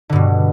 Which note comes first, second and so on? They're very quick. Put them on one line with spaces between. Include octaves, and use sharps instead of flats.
D3 G2 B2